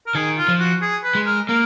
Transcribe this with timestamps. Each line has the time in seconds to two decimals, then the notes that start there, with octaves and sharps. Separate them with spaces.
0.07 A#4
0.15 D#3 G#4
0.38 F4
0.48 F3
0.60 F#4
0.82 G#4
1.04 B4
1.15 G#3
1.26 A#4
1.48 A#3 A#4